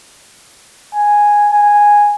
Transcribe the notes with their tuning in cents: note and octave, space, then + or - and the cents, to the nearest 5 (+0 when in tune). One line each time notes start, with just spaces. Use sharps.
G#5 -5
G#5 -10